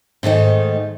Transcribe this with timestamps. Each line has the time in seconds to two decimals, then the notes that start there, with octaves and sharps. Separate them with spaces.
0.23 G#2 D#3 A3 D#4